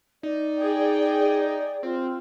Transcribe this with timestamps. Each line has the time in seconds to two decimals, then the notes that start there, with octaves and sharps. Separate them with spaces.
0.23 D#4 D5
0.59 G#4 G5
1.83 C4 F4